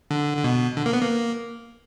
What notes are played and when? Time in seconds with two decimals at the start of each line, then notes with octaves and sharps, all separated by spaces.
0.11 D3
0.37 D3
0.44 B2
0.77 D3
0.86 A#3
0.93 B3
1.02 A#3